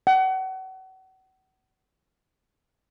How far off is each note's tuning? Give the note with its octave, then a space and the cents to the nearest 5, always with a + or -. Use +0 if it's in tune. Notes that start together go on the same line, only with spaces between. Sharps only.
F#5 +35